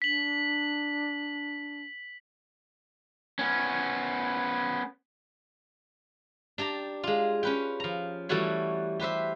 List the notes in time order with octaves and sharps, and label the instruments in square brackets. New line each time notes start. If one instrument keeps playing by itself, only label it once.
[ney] D4 [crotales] B6 F#7
[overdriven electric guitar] B3 C#4
[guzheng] D4 G4 A5 A#5
G#3 F4
C#4 B4 G5
F3 A#5
E3 G3 A3 F#4 C#5
G4 B4 C5 E5